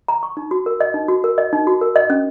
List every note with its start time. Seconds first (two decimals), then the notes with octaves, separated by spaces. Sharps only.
0.08 A#5
0.23 C#6
0.37 D#4
0.51 F#4
0.66 A#4
0.81 D#5
0.94 D#4
1.08 F#4
1.24 A#4
1.38 D#5
1.53 D#4
1.67 F#4
1.81 A#4
1.96 D#5
2.10 C#4